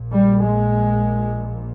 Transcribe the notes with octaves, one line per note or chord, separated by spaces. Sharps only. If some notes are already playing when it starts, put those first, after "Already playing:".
Already playing: A#1 A#2
G3
G#3